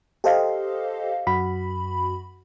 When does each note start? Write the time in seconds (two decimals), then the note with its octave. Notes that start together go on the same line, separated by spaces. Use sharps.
0.24 G4 A4 C5 D#5 F5
1.27 F#2 F#4 B5